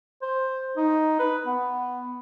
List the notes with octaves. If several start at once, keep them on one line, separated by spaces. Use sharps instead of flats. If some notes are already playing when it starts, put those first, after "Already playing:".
C5
D#4
B4
B3